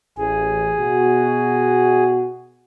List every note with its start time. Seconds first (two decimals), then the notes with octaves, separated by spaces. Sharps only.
0.17 A1 G#4
0.79 B2 F#4